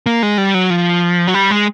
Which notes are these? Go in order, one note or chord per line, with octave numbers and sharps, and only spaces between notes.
A#3
G#3
G3
F#3
F3
F#3
G3
G#3